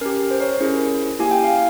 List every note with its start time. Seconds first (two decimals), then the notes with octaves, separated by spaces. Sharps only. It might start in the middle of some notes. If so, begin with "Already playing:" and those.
0.01 C#4 A#4
0.06 G4
0.31 C5
0.40 A#4 C#5
0.60 C#4 E4 G#4
1.19 A#3 E4 G4 G#5
1.31 G5
1.44 F5